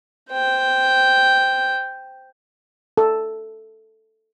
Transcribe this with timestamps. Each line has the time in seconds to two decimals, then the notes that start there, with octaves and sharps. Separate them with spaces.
0.31 C5 G5
2.97 A4